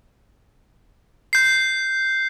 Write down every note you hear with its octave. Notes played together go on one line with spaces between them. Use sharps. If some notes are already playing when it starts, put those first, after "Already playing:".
G6 C7